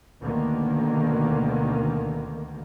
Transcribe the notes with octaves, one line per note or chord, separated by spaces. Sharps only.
D2 B2 D3 D#3 A#3